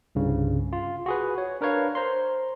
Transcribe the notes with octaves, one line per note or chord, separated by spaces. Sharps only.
C2 G2 C#3
F4
F#4 G#4 B4
C#5
D4 A#4 B4 C#5 F5
C5 A#5 C6